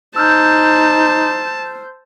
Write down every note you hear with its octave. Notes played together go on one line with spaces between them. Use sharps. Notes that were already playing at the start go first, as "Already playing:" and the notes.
D#4 C5 A5 E6 F6 G6